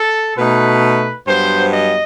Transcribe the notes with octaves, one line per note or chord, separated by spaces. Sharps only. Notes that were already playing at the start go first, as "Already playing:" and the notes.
Already playing: A4
B2 A3 D#4 B4
G2 F#3 B3 C5
D#5